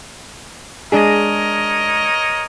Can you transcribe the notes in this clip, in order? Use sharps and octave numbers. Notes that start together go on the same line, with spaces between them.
G#3 D4 G#4 A#4 C#5 D#5